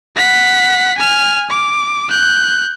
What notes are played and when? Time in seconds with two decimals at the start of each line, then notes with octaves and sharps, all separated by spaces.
0.16 F#5 B6
0.97 G#5 F6
1.50 D6
2.10 F#6 G6